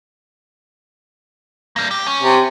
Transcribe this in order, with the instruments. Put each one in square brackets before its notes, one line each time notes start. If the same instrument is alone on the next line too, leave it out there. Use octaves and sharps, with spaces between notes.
[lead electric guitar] G3 A#3
G4
C#4
[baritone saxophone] C3